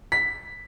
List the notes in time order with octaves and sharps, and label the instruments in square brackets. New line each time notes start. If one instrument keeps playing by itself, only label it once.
[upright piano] B6